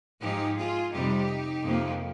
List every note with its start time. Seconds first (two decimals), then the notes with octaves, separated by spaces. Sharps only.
0.21 G#2 F3 G#3 D#4 G4
0.57 F4 G#4
0.92 F2 C3 G3 D#4 G4
1.64 F2 C3 F3 A#3